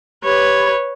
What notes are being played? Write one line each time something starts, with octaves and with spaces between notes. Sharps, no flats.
G4 B4 C#5 B5 G#6